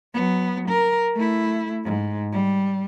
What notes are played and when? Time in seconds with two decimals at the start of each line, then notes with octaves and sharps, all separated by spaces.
0.14 F#3 B3
0.68 A#4
1.16 A3 E4
1.84 G#2
2.33 G3